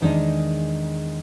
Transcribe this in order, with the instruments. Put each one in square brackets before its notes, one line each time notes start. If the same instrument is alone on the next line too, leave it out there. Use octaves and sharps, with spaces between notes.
[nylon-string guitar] E2 D#3 G#3 D4 D#4